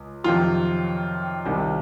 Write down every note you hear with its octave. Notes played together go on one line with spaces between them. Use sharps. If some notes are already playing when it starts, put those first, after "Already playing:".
Already playing: C#2
F2 C3 D#3 F#3 F4
C2 C3 D#3